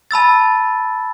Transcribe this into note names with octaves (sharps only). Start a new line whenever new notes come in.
A5 B5 E6 A6